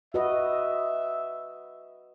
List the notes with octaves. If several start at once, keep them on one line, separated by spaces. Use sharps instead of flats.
F#4 B4 D#5 E5